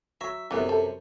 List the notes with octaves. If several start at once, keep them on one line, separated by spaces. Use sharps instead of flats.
F#3 E5
F#2 C3 E3 A3 B3
A4